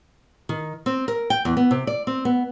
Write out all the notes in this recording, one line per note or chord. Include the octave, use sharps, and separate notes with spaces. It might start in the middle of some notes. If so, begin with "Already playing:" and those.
D#3
C4
A#4
G5
E2
B3
C3
D5
C4
B3